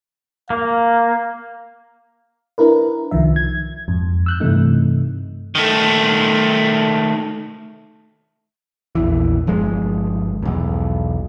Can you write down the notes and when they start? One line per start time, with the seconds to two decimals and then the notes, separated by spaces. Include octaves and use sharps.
0.50 A#3 F5
2.58 D4 E4 A#4 B4
3.11 C2 D#3 F3 E5
3.36 G#6
3.88 F2 G#2
4.26 E6 F#6 G6
4.40 G2 C3 E3 A3 D#4
5.55 D#3 A3
8.95 A#1 E2 E3
9.47 G1 F3 G#3
10.43 B1 E2